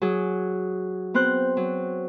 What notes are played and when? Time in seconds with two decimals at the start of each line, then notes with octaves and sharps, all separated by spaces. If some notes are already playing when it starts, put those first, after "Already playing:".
0.02 F#3 G#4
1.14 B3 C4 C5 F#6
1.57 F#3